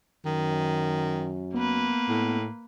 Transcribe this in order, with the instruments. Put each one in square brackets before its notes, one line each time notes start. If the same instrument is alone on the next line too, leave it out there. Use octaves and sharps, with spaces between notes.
[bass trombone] F#2 [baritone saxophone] D#3
[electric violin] A#3 B4 [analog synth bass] B3
[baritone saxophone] A2